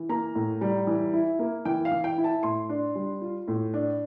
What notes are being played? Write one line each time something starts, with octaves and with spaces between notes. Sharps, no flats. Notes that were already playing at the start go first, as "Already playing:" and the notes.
Already playing: E3
A#3 A#5
A2
G3
E3
E4
A#3
E3 G5
F5
E3
G5
E4
A5
A2 C6
D4
G3
F4
A2
D4